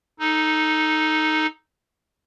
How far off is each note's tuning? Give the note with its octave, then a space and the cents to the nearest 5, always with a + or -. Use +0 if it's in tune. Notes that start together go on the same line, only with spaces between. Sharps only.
D#4 +0 A4 -10